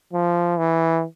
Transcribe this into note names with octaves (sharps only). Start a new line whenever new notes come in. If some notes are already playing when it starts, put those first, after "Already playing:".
F3
E3